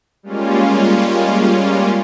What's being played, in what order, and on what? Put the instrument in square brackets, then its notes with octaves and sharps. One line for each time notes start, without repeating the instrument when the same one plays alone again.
[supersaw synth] G3 G#3 A#3 C#4 F4